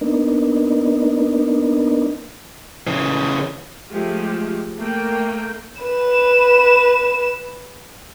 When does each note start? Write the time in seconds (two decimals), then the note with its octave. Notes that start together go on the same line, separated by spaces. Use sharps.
0.01 A#3 B3 D4 D#4
2.87 C#3 E3
3.91 F3 G#3 A3 F4 G4
4.78 A3 A#3 G5
5.82 B4 E7